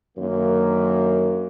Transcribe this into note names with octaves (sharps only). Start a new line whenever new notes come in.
F#2 D3 D#3 A#3